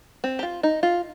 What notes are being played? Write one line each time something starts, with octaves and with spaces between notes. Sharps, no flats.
C4
G4
F4
D#4
F4